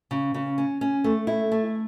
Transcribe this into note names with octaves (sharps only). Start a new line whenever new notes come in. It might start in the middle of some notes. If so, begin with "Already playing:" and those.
C#3
C#3
C#4
C#4
A3
E4
A3